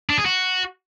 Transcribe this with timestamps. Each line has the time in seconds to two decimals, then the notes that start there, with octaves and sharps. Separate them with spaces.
0.10 D4
0.18 G#4
0.26 F#4